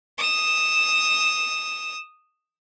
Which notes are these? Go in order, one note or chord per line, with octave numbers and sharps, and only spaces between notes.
D#6 E7